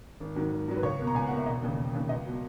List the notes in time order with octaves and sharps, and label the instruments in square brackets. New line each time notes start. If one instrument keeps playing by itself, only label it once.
[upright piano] G#1
G#2 D#3 F#3
G#1
G#2 D#3 F#3
B4
C#2 C#5
B2 A#3
A#5
C#2 G#5
B2 A#3 F#5
E5
E1 D#5
D#2 C#3
E1
D#2 C#3
C#2 D#5
B2 F#3